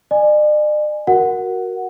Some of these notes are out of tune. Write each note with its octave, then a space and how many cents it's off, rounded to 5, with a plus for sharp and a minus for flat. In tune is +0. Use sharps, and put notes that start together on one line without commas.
D5 +45 G#5 -5
F#4 +0 A#4 +0 F#5 +0